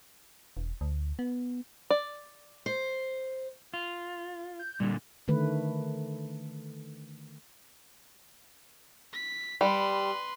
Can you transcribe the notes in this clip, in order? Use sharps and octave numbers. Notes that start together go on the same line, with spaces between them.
E1
D2
B3
D5
C5
F4
G6
A#2 D3 G3
D3 D#3 A3 B4
B6
G3 B4 C6